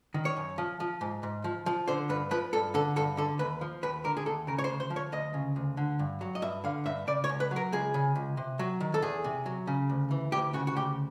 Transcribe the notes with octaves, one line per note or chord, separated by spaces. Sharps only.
D#3
C#5
F#2
F3
F3
G#2
G#2
F3
F3
D3 C5
G2 B4
F3 B4
G2 A4
D3 A4
G2 A4
D3 A4
D#2 B4
F3
D#2 B4
D3 A#4
G#4
D#2 A4
C#3 A#4
C#5
C5
D2
C5
F3
C#5
D2 D#5
C#3
D2
D3
G2
F#3
D#5
G2 E5
D3 F5
G2 E5
C#3 D5
C#5
C#2
B4
F#3
A#4
C#2 G#4
C#3
C#2
C3
F#3
D#3
A4
E2 G#4
C3
F#3
C#3
D2
E3
D2 G4
C#3 F#4
F#4
D2 G4